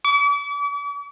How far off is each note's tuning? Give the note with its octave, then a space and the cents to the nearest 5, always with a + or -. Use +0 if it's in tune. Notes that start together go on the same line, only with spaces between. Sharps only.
D6 -45